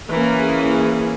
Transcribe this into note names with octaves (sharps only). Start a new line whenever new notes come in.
E3 A#3 C#4 A#4
G#4
G#4